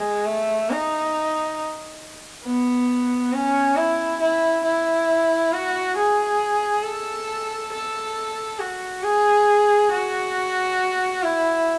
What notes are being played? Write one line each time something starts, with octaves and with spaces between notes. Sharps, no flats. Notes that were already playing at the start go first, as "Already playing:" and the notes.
Already playing: G#3
A3
D#4
B3
C#4
E4
E4
E4
F#4
G#4
A4
A4
F#4
G#4
F#4
E4